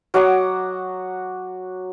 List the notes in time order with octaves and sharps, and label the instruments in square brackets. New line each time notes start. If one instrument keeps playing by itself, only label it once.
[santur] F#3 F#5 D6 D#6